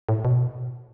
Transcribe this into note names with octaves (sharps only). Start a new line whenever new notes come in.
A2
B2